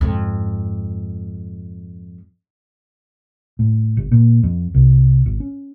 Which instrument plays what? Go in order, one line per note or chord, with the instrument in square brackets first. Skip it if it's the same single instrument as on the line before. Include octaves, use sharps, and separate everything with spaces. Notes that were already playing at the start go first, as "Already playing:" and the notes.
[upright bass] F2 G#2
[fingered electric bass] A2
G1
A#2
F2
C2
G#1
C#4